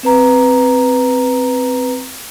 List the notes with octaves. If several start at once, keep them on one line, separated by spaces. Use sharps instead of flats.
C4 B4 A#5